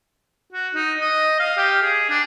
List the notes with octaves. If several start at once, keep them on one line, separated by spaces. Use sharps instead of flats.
F#4
D#4
D#5
F5
G4
G#4
D4